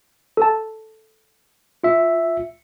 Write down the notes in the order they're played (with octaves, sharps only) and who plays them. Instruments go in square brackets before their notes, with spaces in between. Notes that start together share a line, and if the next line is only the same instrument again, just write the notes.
[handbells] A4 A5
[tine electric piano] F4 E5